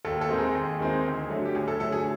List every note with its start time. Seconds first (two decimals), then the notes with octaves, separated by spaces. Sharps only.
0.05 D#2 A4
0.21 A4
0.29 D#3 G#3 C4 D#4
0.38 G#4
0.55 D#2
0.80 D#3 G#3 C4 D#4
1.05 D2
1.30 D3 F#3 A3
1.45 G4
1.55 D2 G#4
1.68 A4
1.80 D3 F#3 A3 A4
1.92 G#4